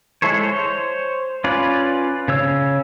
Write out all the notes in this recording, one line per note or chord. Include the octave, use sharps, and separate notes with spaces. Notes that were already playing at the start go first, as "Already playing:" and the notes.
G#3 E4 A4 C5 C#5
C5 C#5
C#4 F4 B4 D5
C#3 C#5 E6